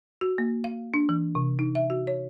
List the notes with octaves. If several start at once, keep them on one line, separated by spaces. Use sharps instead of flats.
F#4
A#3
F5
D4
E3
C3
D#4
E5
F#4
C#5